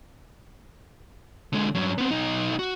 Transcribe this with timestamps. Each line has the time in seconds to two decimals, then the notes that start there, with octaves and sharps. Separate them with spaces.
1.53 D3 G#3
1.75 G2 F#3
1.98 B3 C4
2.11 B1 D#4
2.59 F#4